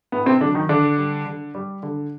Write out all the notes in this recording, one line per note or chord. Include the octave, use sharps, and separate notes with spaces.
A2 B3
C3 C4
D3 F#3 D4
D#3 D#4
D3 D4
G3
D3
G3
D3